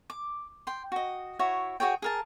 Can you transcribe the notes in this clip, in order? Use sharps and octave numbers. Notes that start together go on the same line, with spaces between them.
D6
G5 C6
F#4 D#5
E4 F#4 C#5 E5
F#4 G#4 C#5 G5
G#4 A#4 A5